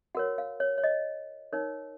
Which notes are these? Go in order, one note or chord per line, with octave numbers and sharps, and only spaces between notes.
F#4 A#4 C#5 F#5
F5
C#5
C#5
D#5
D#4 A#4 C#5